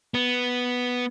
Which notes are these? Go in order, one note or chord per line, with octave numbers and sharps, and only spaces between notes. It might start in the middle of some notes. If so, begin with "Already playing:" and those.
B3